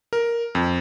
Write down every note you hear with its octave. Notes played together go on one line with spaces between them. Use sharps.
A#4
F2